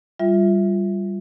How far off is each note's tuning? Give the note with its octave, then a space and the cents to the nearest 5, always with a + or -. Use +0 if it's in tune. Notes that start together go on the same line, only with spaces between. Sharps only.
G3 +0 F4 +0 E5 +0